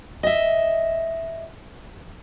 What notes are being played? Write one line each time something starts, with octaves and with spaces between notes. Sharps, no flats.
D#5 E5